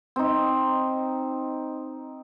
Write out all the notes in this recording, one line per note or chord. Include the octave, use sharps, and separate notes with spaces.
C4 D#4